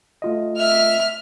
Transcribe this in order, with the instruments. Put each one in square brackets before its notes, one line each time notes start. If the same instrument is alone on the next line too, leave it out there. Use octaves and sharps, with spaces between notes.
[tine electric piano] A3 F4 D#5
[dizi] E5 [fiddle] F6